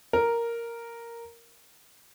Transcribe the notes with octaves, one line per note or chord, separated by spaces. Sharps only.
A#4